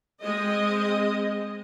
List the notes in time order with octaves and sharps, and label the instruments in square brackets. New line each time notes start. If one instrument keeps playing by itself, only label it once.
[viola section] G#3 C4 D#5